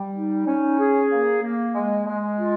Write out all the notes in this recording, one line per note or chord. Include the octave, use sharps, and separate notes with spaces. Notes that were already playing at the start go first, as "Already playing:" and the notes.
Already playing: G3
D#4
C#4
G#4
A#3
A#3
G#3
G#3
F4